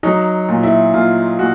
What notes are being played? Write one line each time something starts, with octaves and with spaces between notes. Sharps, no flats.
F#3 D#4
A#2
E4
A#2 F4
A#2 F#4